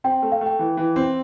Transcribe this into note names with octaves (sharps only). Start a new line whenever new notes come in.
C4 G5
A3
F5
A3 G5
E3
E3
C4